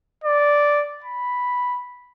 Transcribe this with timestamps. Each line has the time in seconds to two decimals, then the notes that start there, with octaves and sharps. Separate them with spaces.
0.24 D5
1.04 B5